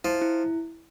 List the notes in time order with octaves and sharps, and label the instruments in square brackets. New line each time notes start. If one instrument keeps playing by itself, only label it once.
[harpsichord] F3 [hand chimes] E4
[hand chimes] E4